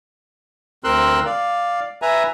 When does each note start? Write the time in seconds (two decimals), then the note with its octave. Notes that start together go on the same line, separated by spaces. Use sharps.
0.84 D2 C4 A#4 C6 E6 F#6
1.26 D5 F5
2.02 B4 E5 G#5 A#5